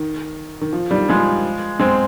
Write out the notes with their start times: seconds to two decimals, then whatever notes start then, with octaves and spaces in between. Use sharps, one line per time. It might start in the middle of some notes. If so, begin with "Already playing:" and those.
Already playing: D#3
0.61 D#3
0.73 F3
0.91 D#3 G3
1.09 F3 G#3
1.80 G#3 C4